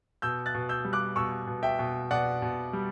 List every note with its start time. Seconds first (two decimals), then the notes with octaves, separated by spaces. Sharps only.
0.22 B2 E6 G6
0.46 F#6 A6
0.54 B2
0.69 E6 G6
0.85 G3
0.93 D6 F#6
1.16 B2 C#6 E6
1.47 B2
1.63 E5 G5
1.79 B2
2.11 B2 D5 F#5
2.42 B2
2.73 G3